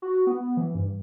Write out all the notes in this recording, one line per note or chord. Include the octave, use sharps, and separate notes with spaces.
F#4
B3
E3
G2